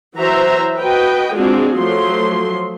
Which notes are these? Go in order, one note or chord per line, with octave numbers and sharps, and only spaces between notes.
E3 F#3 F#4 C5 E5 A#5
F#4 B4 D#5 G5
G#3 C4 D4 F4 F#4 G#4
F3 F#3 A3 C6